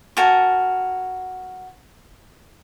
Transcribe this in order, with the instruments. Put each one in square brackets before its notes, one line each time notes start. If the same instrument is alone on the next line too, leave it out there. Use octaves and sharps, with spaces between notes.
[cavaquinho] F#4 A#4 G#5 A5